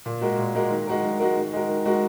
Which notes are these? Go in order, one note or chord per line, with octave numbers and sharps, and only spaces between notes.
A#2
G#3 F#4 A#4
A#2
G#3 F#4 A#4
D#3
G#3 F#4 A#4
D#3
G#3 F#4 A#4
D#3
G#3 F#4 A#4
D#3
G#3 F#4 A#4